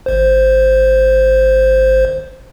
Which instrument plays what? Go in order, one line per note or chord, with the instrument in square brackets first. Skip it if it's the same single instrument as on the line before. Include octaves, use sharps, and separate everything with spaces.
[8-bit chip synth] G#1 C5